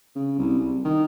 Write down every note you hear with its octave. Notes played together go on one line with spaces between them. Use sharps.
C#3
C2
C2
D#3